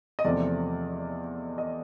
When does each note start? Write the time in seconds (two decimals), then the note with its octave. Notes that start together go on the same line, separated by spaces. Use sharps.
0.19 D#5
0.25 E2 C3 F3 A3 D5
1.58 D#5